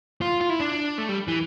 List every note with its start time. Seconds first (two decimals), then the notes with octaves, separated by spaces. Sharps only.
0.21 F4
0.41 F4
0.49 E4
0.60 D4
0.98 A3
1.09 G3
1.28 E3